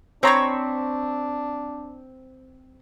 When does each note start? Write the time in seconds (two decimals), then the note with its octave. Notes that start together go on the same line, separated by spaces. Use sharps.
0.23 C4 D4 C5 C#5 A#5 B5 C#6